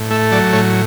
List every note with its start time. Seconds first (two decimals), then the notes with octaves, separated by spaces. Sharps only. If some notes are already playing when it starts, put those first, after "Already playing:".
Already playing: A2
0.11 A3 E5
0.32 F#3 D5
0.53 A2 C#5